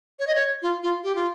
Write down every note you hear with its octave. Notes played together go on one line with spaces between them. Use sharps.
C#5
D#5
C#5
F4
F4
G4
F4